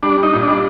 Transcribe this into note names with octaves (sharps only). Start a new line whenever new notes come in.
G3 D4
G3
D#4
A#2
G3 D4